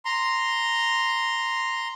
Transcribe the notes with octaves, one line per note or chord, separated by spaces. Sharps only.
A#5 C6